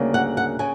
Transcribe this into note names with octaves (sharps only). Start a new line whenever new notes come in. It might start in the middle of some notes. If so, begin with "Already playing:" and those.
Already playing: D2 C#3 G3 A#3
F#5
F#5
C#3 G#5